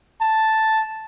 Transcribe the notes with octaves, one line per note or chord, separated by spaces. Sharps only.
A5